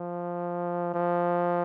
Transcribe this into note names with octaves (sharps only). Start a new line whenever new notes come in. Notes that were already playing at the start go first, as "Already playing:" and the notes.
Already playing: F3
F3